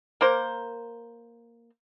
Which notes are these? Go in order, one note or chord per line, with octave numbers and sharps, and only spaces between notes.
A#3 A#4 C5